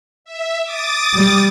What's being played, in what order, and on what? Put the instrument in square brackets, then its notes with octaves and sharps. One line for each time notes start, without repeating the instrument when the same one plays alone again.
[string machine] E5
D6 D#6 A6
[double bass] G3